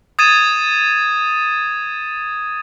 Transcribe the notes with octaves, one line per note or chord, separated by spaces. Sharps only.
D#6 G#6 A6 D#7 E7